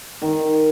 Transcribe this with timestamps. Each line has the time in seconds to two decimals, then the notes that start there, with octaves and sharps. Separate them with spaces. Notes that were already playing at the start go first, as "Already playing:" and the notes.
0.22 D#3